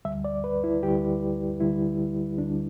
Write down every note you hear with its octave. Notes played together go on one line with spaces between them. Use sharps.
D2 D3 G3 E5
D5
B4
E4
D2 D3 G3 G4
D2 D3 G3 E4
D2 D3 G3 D4